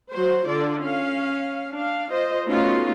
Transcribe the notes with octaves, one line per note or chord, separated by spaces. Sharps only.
F#3 F#4 C5
D3 D4 F4 D5
C#4 F5
D4 F5
F4 C5 D#5
A3 B3 C#4 D#4 F4 F#4